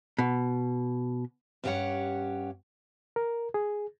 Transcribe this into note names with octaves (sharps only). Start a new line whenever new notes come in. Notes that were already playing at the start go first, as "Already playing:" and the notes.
B2
G2 C#4 G4 G#4 C#5 F#5
A#4
G#4